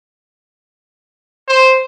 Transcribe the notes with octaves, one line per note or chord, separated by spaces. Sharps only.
C5